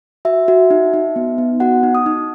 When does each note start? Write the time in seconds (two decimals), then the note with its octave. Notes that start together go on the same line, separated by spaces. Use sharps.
0.25 F#4 E5
0.48 F#4
0.70 D#4
0.93 D#4
1.16 B3
1.38 B3
1.60 F#4 F#5
1.83 D#4
1.95 D#6
2.06 D#4